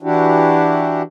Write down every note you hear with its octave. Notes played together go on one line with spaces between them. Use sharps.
E3 D4 E4 F#4 G4